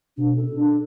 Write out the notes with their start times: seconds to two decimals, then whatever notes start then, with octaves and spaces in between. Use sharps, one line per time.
0.17 B2 D4
0.37 A4
0.56 D4